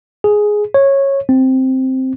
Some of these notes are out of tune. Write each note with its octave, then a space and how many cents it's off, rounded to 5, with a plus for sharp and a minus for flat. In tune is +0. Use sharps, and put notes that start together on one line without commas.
G#4 +5
C#5 -15
C4 +0